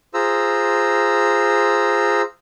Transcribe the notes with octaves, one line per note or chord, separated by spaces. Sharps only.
F4 G#4 C5 A#5 E6